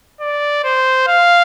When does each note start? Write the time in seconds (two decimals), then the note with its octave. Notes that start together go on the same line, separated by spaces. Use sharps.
0.20 D5
0.64 C5
1.07 F5